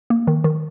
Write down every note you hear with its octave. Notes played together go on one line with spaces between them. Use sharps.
A#3
D#3
D#3